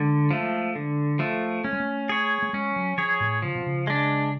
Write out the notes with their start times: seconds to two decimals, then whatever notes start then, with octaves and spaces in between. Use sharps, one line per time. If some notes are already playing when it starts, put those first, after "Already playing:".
Already playing: D3 G#3
0.31 F3 A3
0.75 D3
1.19 F3 A3
1.64 A3 C#4
1.73 G#3
1.80 A3
2.09 G#4 C#5
2.42 A3
2.53 G#3 C#4
2.76 F#3
2.98 F3 G#4 C#5
3.20 A2
3.42 C#3 F3
3.55 B2
3.67 C#3
3.87 G#3 D4